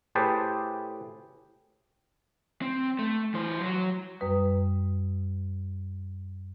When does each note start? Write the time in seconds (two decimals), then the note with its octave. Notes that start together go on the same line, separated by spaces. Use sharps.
0.15 A2 G4 G#4 B4 C5 A5
2.62 C4
2.99 A3
3.34 E3 C5
3.61 F#3 F#4
4.20 F#2 G3 B4 D#6